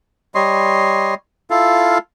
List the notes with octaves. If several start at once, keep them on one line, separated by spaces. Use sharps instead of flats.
G3 C#5 D#5 C6
E4 F4 A4 F5